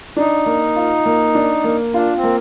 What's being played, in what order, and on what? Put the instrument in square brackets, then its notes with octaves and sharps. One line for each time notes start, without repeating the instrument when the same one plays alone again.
[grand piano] D4 [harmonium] D#4
[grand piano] A#3
F4
A#3
D4
A#3
[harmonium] D4 [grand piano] F4
[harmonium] C4
[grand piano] A#3